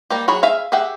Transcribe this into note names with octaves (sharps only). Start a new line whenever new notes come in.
G3 A#3 G4
F#3 G#4 C#5 B5
G#4 E5 F5
G4 G#4 E5 F#5 G5